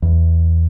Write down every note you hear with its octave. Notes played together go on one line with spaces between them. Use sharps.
E2